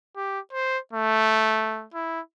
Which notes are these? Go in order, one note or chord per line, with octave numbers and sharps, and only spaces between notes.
G4
C5
A3
E4